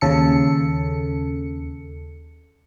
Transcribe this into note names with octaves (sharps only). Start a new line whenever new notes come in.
D#2 C#3 A4 C#7